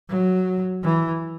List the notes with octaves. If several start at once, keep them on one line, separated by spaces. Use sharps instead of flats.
F#3
E3